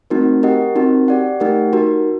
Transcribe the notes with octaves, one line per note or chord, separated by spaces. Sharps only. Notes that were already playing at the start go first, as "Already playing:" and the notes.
A3 C4 D#4 F#4 A#4
G4 A#4 D#5 F#5
C4 D#4 F#4 A#4
G4 D5 F#5
A3 D#4 G4 A#4 F#5
D#4 F#4 A#4